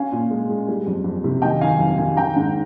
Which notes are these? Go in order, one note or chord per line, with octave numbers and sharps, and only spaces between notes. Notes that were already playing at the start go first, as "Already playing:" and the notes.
Already playing: C#4 F5 G#5
A#2
G#3
G#3
G3
F2
F2
C3
D#3 D#5 G5
D#3 F5 G#5
F2
D#3 F5 G#5
D#3 G5 A#5
G#2